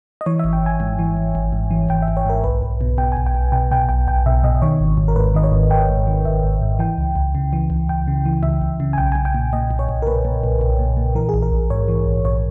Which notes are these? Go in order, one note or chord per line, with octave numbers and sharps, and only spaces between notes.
D#5
E3 C#5
G#1 E5
G5
G#1 G#5
G#2
E3
G#1
G#1
G#2
E3
G#1 G5
E5
G#1
C#5
G#2 A#4
B1 B4
B1
B2
B2 G5
B1 G#5
G5
B1
B2 G5
B2 G5
B1 G5
B1 G5
B2 E5
B2 D#5
D#3 C#5
G#1
G#1
A#4
G#2 B4
D#3 D#5
C#5
G#1
G#1 G5
G#2
D#3
G#1 E5
G#1
G#2
E3 G5
C#2
C#2
C#3
E3
C#2
C#2 G5
C#3
E3
C#2 E5
C#2
C#3
G#5
B1 G5
B1 G#5
G5
A#2
A#2 D#5
B1
C#5
B1
A#4
A#2 B4
A#2
B1
B1
A#2
A#2
E3 A#4
G#4
A#1
A#4
A#1
G#2 C#5
E3
A#1
A#1 C#5